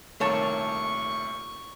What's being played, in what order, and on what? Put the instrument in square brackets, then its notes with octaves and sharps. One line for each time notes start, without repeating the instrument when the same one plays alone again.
[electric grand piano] C2 D#3 A3 [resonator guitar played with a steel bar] A#2 C#5 A5 [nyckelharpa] C#6